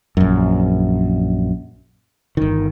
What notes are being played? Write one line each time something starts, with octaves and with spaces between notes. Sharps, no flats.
A#1 F#2
G1 D#3